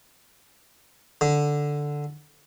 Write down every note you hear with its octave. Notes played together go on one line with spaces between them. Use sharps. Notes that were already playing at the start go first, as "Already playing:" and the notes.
D3